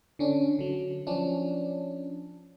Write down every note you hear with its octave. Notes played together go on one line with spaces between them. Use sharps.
D3 C#4 D4
D3 F#3
F3 C#4 D4